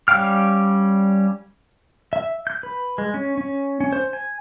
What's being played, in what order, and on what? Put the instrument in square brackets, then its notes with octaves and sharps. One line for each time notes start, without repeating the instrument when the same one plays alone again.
[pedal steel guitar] G3 C#4 F5 G5 F6
E5
G6
B4
G#3
C#4
C#4
C#4
C5
G#5